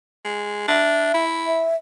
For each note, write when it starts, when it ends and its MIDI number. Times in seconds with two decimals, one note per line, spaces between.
0.25 0.65 56
0.68 1.14 62
0.68 1.24 76
1.14 1.68 64
1.46 1.76 76